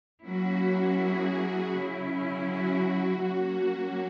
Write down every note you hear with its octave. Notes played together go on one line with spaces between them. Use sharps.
F#3 A#3 C#4 E4 F#4
G#4
C#3 F#3 C#4 E4
F#4
F#3 A#3 C#4